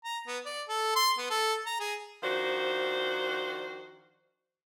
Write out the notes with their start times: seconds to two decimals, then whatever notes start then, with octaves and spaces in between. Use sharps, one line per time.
0.05 A#5
0.27 B3
0.46 D5
0.69 A4
0.96 C6
1.18 B3
1.30 A4
1.66 A#5
1.80 G#4
2.23 D#3 F3 D4 F#4 C5